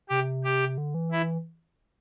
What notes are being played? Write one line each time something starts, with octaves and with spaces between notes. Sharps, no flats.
C3 G4
G4
D3
E3
E4